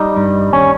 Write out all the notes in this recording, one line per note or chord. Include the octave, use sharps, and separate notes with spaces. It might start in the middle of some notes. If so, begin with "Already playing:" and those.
Already playing: G3 D#4
G2
D#2 C#4